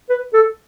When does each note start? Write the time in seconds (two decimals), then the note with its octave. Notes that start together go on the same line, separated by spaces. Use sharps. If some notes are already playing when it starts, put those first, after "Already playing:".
0.10 B4
0.34 A4